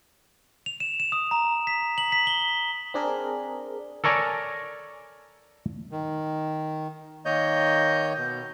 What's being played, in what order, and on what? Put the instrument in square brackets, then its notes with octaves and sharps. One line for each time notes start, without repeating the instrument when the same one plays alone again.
[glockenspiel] F7
E7
E7
D#6
A#5
B6
F#7
B6
G7
[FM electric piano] C4 D4 G#4 A#4
[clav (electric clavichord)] A4 A#4 C#5 D5 G#5 A#5
[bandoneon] D#3
D#3 A#3 C#5 D#5 G6
B2